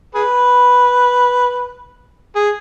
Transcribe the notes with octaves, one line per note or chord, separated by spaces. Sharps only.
G#4 B4
G#4